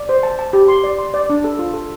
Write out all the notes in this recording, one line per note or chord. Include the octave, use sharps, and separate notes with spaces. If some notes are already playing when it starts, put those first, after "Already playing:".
Already playing: D5
C5
A5
A5
G4
C6
D5
C6
D5
D4
A4
F4
A4